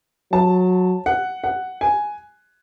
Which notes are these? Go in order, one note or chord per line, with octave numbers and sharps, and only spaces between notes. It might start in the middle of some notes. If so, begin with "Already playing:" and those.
F#3 A5
F#5
F#5
G#5